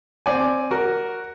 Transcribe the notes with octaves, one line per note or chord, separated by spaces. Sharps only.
C4 D5 G#5
F#4 A#4